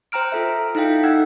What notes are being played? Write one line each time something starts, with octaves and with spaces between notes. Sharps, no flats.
C5 G5 A#5 F6 D7
F4 A4 E5
D#4 E4 A4 F5 G5
D#4 F#5 E6 G#6